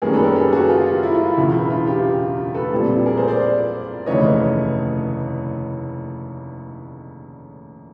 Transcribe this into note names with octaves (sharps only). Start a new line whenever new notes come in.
F#2 D#3 G3 A#3 C#4 G#4 A#4
A4 B4
G#4 A#4
G4 A4
F#4 G#4
F4 G4
F4
E4
F4
E4
E1 E2 C#3
E4
F4
F4 G4
A4 B4
A#1 A#2 G3 C4
G#4 A#4
A#4 C5
C5 D5
F1 D#2 C#3 E3 A3 C#5 D#5